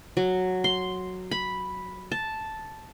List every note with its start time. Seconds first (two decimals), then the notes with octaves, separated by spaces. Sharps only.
0.17 F#3
0.64 C6
1.31 B5
2.12 A5